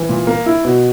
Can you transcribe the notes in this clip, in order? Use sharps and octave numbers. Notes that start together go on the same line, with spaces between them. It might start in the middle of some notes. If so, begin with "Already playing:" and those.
Already playing: E3
A#2
A#3
E4
B2